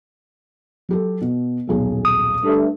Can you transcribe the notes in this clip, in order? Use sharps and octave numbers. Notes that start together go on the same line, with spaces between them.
F#3 G4 A4
B2
D#1 B1 G#4
D#6
G2 A3